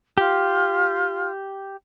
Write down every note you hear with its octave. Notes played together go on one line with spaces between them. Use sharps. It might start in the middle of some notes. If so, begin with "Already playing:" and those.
F4 G4